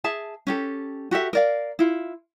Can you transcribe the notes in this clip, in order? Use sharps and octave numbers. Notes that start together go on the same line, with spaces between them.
G#4 E5 A5
C#4 G4 A4
F#4 G4 A4 E5
A#4 D5 F5
E4 F4